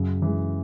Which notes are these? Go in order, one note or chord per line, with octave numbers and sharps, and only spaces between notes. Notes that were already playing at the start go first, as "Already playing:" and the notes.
Already playing: F#2 C#3
E3 G#3